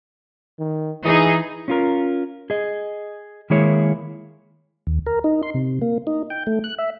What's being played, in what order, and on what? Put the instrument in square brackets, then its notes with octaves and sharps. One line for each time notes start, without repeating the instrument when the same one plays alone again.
[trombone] D#3
[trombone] E3 [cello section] D#4 G#4
[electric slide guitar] C#4 F4 A#4
G#4 D#5
D#3 G#3 A#3 E4 G#4 C#5
[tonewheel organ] D#2
A#4
D#4
C6
C3
A#3
D#4
G5
A3
F#6
E5